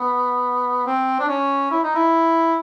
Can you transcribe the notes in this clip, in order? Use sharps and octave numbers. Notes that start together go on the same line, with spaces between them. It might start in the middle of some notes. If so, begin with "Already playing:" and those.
Already playing: B3
C4
D4
C#4
E4
D#4
E4